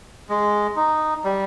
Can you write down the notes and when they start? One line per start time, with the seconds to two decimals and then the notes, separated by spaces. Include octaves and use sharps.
0.29 G#3
0.76 D#4
1.24 G3